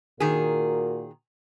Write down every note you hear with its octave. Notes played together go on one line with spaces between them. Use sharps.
A#2 D#3 F#4 G#4 A#4